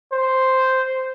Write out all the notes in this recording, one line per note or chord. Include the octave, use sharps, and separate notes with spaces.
C5